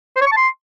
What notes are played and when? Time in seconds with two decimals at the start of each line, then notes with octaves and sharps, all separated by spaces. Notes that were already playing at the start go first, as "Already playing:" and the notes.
0.16 C5
0.21 C#5
0.26 C#6
0.32 A5
0.37 C6